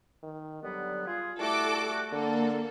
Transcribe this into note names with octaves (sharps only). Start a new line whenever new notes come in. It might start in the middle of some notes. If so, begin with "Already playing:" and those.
D#3
D3 F#3 G3 B3
F4 G#4
G3 A3 E4 F#4 A4 D6
D3 A#3 A4